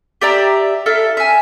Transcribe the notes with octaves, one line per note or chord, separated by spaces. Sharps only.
G4 D5 E5 A#5
E4 A4 E5 F5
E5 G#5